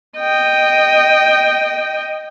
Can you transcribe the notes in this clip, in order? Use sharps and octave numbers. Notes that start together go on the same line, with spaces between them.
D#5 G5